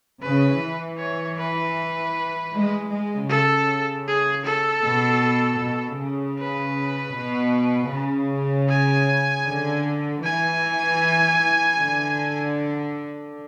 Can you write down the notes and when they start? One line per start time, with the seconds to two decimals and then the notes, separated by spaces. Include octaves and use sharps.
0.22 C#3 B4
0.61 E3
0.98 C#5
1.38 B4
2.53 G#3
2.91 G#3
3.29 C#3 A4
4.07 G#4
4.45 A4
4.84 B2
5.61 B2
5.99 C#3
6.39 B4
7.16 B2
7.92 C#3
8.69 G#5
9.46 D3
10.23 E3 G#5
11.78 D3